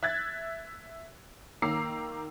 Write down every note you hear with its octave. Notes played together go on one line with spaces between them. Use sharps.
E5 F#6 G#6 A6
D#3 A#3 A#5 D6 E6 C7